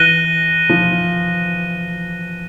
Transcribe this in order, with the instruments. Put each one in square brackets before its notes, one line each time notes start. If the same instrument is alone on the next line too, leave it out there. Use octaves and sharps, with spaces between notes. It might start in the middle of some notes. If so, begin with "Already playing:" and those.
Already playing: [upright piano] E3 [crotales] F#6 A#6 D#7 G7
[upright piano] F3